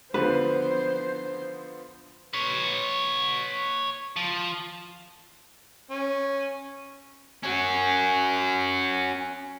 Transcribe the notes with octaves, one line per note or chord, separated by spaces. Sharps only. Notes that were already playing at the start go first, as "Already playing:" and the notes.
D3 F3 B3 B4 C5
B4 C#5
F3
C#4
C#4 F#4